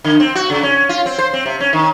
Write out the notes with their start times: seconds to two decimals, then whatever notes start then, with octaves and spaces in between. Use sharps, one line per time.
0.04 D3
0.20 C4
0.35 F#4
0.50 C#3
0.63 C#4
0.89 F4
1.06 C4
1.19 C5
1.33 C4
1.46 C3
1.60 C#4
1.73 D#3